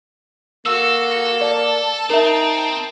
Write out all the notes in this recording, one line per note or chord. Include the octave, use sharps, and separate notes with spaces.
A#3 F#4 A4 E6
D5 A5
C4 D#4 A#4 E5